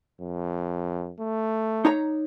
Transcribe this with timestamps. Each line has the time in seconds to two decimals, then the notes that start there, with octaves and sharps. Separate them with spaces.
0.21 F2
1.20 A3
1.85 D#4 C#5 A#5